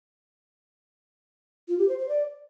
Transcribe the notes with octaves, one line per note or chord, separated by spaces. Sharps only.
F4
G4
C5
C5
D5